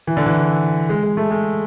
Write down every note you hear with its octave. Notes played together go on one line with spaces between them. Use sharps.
E3
D3
E3
G#3
G#3
A3
G#3